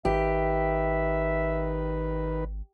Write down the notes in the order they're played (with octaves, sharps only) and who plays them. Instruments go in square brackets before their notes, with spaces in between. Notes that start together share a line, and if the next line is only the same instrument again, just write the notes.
[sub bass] G#1 [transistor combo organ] D#3 B4 [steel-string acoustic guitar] G4 [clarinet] E5